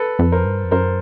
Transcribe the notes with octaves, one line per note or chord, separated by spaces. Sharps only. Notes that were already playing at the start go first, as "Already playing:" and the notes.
Already playing: A4 B4
F2
A#4 C5
G2
F2
F#2 A#4 C5